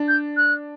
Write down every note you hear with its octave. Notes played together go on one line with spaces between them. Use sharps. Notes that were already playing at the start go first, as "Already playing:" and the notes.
Already playing: D4
G6
F#6